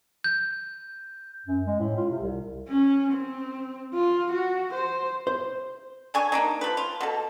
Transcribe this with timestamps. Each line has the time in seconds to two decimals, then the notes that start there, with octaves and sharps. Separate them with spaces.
0.24 G6
1.46 F#2
1.67 G#3
1.79 A2
1.96 F4
2.10 C3
2.21 C2
2.68 C#4
3.13 C4
3.94 F4
4.32 F#4
4.73 C5
5.27 C5
6.14 D4 G#5 C#6
6.32 A#3 D4 D#4
6.61 F3 B4
6.77 F4
7.01 B2 A4